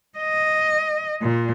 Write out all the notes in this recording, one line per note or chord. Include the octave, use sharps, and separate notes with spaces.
D#5
A#2